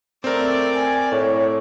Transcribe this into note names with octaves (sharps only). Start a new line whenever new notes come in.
A3 C4 A#4 D5
G#5
A2 C#5